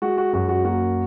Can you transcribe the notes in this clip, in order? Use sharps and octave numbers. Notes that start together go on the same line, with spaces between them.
G#3 F#4
F#4
F#2 F#4
F#4
A#3 F#4